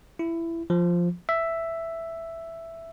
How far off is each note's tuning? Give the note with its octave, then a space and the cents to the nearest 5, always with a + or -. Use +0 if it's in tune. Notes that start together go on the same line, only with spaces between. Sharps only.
E4 +15
F3 +0
E5 +5